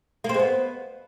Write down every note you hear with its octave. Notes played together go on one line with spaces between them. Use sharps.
A#3
C4
G#3
B3